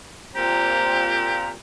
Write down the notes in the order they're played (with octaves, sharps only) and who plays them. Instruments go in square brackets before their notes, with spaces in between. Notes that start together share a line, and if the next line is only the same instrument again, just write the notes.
[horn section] A#2 C4 A#5 [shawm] G4